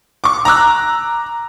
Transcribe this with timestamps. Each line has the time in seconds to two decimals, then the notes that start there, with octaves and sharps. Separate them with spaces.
0.24 C#6 D6
0.45 A#5 D6 E6 F#6